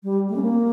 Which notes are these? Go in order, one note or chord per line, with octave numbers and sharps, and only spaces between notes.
G3
A3
C#4
A#3